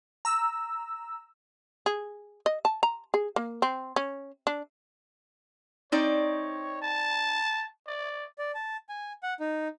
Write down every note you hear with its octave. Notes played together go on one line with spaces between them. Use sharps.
A#5 E6
G#4
D#5
A5
A#5
G#4
A#3
C4
C#4
D4
C4 D#4 C#5 D5
A5
D5
D5
A5
G#5
F#5
D#4